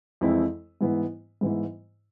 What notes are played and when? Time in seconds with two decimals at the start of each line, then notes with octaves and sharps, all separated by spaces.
0.21 F2 E3 G#3 C4 E4
0.81 G#2 E3 B3 E4
1.41 G#2 E3 B3 E4